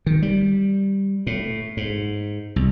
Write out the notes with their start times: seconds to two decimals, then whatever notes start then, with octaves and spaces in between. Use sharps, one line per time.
0.06 D#3
0.22 G3
1.27 A2
1.77 G#2
2.56 C2